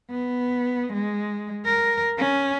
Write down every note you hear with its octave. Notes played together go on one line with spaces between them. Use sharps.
B3
G#3
A#4
C#4